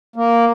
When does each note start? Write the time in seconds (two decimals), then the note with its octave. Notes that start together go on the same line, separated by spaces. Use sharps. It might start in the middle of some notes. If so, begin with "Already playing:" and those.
0.16 A#3